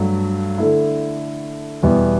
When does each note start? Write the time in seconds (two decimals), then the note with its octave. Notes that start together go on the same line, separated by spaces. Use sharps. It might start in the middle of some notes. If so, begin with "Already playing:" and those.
Already playing: G2 F#3 A3
0.58 D3 A3 E4
1.83 E2 B2 G3 B3 E4